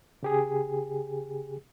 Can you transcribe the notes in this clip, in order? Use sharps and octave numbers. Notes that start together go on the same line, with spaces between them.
C#3 G4 G#4